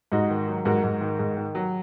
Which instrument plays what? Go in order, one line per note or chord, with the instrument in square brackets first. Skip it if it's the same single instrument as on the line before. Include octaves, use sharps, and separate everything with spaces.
[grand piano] G#2 D#4 F#4
D#3
F#3
G#2 F#4 A#4
G#2
D#3
G#2
D#3
F#3